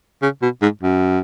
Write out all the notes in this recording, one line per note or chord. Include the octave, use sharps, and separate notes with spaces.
C#3
B2
G#2
F#2